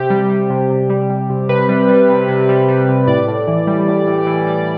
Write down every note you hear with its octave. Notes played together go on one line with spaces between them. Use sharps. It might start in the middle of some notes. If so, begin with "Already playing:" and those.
Already playing: C3 G4
G3
G3
C3
C3
G3
G3
C3
C3 B4
G3
G3
C3
C3
G3
G3
C3
A2 D5
A2
E3
G3
A2
A2
E3
G3